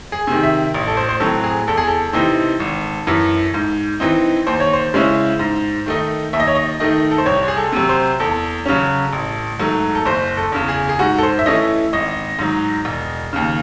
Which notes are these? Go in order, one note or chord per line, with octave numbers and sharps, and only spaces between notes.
G#4
C3 D#3
E5
A1
A4
C5
C5
A2 F#3 C4 A4
G#4
E2 A4
G#4
A4
C3 E3 C4 D#4
G#1
F#2 E3
G#2
E3 C4 D#4
D#2 C5
C#5
C5
C#3 G#3 C#4 E4
G#2
D#3 A3 D#4
D#2 E5
D#5
C#5
D#5
D#3 A3 D#4 D#5
A4
C5
C2 C#5
G#4
A4
C3 F#3
C5
E2 A4
C#3 F#3 C#4
A1
G#2 F#3 A3
A4
F#1 C5
A4
E2 C#3
G#4
G#4
G#2 F#4
A4
C5
E5
E3 A3 C#4 E4 D#5
G#1 D#5
G#2 F#3
E1
D#2 C#3